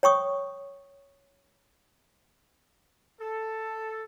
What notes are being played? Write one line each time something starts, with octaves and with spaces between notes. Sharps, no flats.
C#5 G5 C#6 D#6
A4